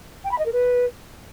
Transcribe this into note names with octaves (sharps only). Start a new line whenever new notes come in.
G5
B5
D#5
A#4
B4